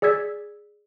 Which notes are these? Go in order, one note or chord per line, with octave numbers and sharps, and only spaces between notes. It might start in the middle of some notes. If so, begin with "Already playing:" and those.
G#4 D5 E6 G#6 B6